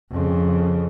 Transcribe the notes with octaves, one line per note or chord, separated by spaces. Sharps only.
F2 C#3